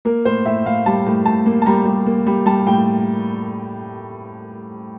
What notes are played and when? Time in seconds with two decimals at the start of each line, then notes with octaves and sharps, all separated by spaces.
0.05 A#3 A#4
0.25 A2 C5
0.46 A2 E5
0.66 A2 F5
0.86 G3 A5
1.06 A2
1.26 A2 A5
1.46 A#3
1.62 A5
1.66 G3 A#5
1.86 G3
2.06 A#3
2.27 G3
2.46 G3 A5
2.66 A2 G5